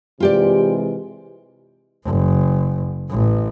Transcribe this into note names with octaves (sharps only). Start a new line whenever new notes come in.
C3 E3 G#3 F4 G4 D5
F#1
A1